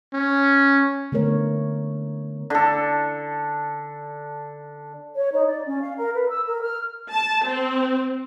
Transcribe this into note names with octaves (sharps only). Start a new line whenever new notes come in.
C#4
D3 A3 B3 A#4 C#5
D3 A4
C#5
D#4
D5
C#4
F5
A#4
B4
E6
A#4
F6
A5
C4